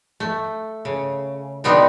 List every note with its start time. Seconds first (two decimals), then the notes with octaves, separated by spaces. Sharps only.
0.20 A3
0.85 C#3
1.64 B2 D3 G3 B3 C4 D#4